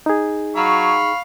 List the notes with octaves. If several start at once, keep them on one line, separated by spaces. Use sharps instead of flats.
D#4 G#4
F#3 F5 B5 C#6